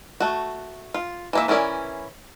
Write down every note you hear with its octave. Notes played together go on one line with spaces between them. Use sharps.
A3 F#4
F4
E3 A#3 E5
E3 C#4 E4 A#4 D5